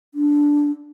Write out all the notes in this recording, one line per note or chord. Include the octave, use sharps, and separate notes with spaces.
D4